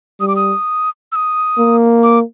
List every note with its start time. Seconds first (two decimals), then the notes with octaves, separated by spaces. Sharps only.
0.20 G3 D#6
0.28 D6
0.36 D#6
1.12 E6
1.15 D#6
1.58 A#3
2.03 D6